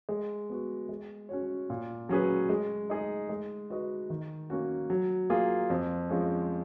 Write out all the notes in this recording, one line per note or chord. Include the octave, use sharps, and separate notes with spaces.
G#3
B3 F#4
G#3
C#4 F#4 C#5
A#2
F#3 C#4 G#4 B4
G#3
D#4 G#4 D#5
G#3
D#4 F#4 B4 D#5
D#3
A#3 C#4 F#4
F#3
A#3 F4 G#4
F2
F3 G#3 C#4